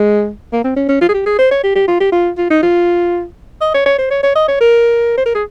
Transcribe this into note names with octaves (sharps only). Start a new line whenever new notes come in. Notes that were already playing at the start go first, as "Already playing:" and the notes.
Already playing: G#3
A#3
C4
C#4
C#4
F4
G#4
G4
G#4
C5
C#5
G4
G4
F4
G4
F4
F4
D#4
F4
D#5
C#5
C#5
C5
C#5
C#5
D#5
C#5
A#4
C5
A#4
G#4